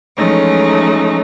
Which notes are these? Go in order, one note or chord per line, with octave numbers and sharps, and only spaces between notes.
E3 F3 G#3 A3 C#4 D#4